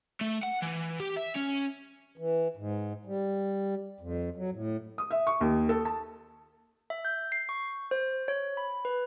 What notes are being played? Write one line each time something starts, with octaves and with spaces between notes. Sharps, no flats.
A3
F#5
E3
G4
E5
C#4
E3
G#2
G3
F2
F#3
A2
D#6
E5
C#6
D#2
A4
A5
E5
G6
C7
C#6
C5
C#5
B5
B4